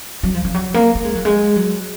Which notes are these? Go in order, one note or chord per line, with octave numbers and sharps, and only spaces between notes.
F#3
F3
F3
F#3
A#3
A#3
G#3
F#3
G#3
F#3